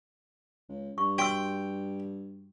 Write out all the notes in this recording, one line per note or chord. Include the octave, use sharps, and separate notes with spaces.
C#2
G2 C#6
F#4 G5 C6 E6